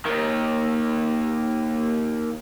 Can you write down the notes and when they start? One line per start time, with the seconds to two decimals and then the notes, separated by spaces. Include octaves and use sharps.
0.05 D#2 D#3